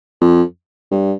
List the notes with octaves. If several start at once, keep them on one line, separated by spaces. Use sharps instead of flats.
F2
G2